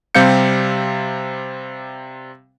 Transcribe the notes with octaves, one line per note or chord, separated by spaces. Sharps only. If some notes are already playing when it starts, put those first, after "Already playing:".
C3 G3 C4 F5 G6 C#7